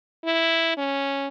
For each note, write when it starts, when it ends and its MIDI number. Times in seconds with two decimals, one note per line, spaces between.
0.25 0.77 64
0.77 1.28 61